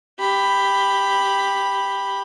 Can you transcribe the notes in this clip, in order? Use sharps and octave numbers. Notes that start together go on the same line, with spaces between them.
G4 B5